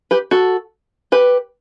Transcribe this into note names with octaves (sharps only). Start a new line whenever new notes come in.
G4 B4
F#4 A4
G4 B4